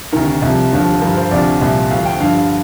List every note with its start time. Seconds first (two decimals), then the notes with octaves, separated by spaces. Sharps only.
0.13 D2 C3 D#3 A#4
0.42 C2 C3 F3
0.72 D#2 D3 F3
1.01 G2 D3 F3 A#4
1.17 C5
1.31 D2 C3 F3 D5
1.61 C2 A#2 F3
1.91 D2 D3 F3 F5
2.05 G5
2.20 G2 D3 F3 F5